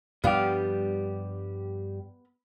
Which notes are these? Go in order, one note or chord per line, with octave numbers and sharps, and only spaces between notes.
G2 F3 G3 B3 D4 G4 F5